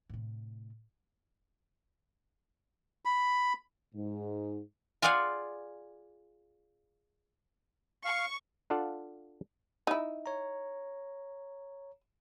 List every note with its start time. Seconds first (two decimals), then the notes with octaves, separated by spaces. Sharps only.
0.09 A2 C3
3.05 B5
3.94 G#2
5.02 F4 G#4 D5 F5 F#5 G#5
8.05 F5 C#6
8.70 D4 F4 A4 D5 F5 F#5
9.87 D#4 E4
10.26 C#5 A#5